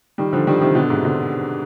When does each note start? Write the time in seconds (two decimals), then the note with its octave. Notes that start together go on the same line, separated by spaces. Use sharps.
0.18 D#3 G3
0.33 D3 F3
0.47 D#3 G3
0.61 C3 D#3
0.75 B2 D3
0.90 G#2 C3
1.04 B2 D3